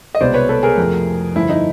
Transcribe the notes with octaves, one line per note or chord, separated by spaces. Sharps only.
D#5
C2 B2 G#3 B3 C5 D5
B4 C#5
A4 B4
G#4 A#4
F2 C3 F3 A3
G2 D3 F3 E4
D#4